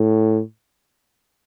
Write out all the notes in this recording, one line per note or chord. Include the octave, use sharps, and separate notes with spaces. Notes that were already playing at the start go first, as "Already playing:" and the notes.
Already playing: A2